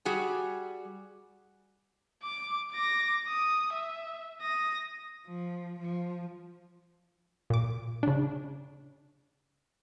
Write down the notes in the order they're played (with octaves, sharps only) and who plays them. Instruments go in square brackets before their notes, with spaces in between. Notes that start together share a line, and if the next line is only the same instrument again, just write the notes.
[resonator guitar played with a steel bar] G3 F#4 G#4
[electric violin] D6
D6 A#6
D#6
E5
D#6 A#6
[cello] F3
F3
[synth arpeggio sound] A#2 D6
C#3 D4